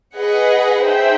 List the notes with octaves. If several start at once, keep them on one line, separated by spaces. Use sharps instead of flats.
G#4 B4 D#5 F#5
D#4 G#4 C5 E5 G5